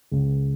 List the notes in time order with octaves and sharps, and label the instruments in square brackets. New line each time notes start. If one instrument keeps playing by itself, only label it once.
[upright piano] C#2